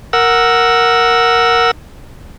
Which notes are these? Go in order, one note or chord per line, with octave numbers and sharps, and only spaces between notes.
A#4 F#5 E6